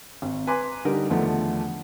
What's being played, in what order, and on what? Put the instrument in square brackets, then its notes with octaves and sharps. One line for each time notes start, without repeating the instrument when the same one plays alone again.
[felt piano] G#1
B4 G#5 A#5 C6 D6
D3 G3 D#4 A#4
E2 D3 D#3 F3 A3 B3